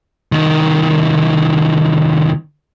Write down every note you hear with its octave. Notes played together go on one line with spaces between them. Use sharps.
C2 D#3